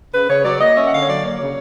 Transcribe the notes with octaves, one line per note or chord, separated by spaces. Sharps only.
C#3 B4
C#3 C#5
F#3 D5
A#3 D#5
C#4 E5
F#5
D3 F5
C#5
F#3 D5
A#3 C#5
C#3